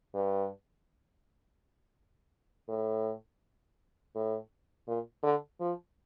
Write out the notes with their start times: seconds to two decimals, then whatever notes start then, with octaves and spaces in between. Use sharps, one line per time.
0.14 G2
2.68 A2
4.15 A2
4.88 A#2
5.23 D3
5.60 F3